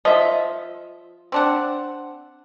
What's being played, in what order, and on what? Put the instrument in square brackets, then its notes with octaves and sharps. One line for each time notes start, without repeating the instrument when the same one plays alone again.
[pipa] F3 [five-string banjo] D#5 E5
[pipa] C4 D4 F#5